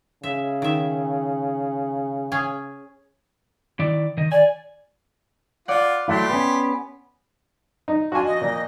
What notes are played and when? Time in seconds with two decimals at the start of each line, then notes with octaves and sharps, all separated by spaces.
0.24 C#3 E5
0.62 D#3 E5
2.32 C#4 G#4 G#5
3.79 D#3 E4 D5
4.17 D#3 D#5
4.32 D5 G#5
5.68 F4 D5 F#5
6.08 F#3 A3 E4 G4 C6
6.30 B3 C#4
7.88 D#4
8.12 D4 F4 F#4 G#5
8.25 F2 D#5
8.41 A#2